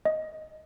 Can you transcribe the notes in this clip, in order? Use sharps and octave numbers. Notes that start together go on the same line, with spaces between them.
D#5